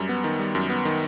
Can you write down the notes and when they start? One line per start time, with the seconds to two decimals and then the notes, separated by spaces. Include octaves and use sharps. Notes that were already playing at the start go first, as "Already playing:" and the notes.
Already playing: F#2 G3
0.09 B3
0.24 D#3
0.39 G3
0.55 F#2
0.70 B3
0.85 D#3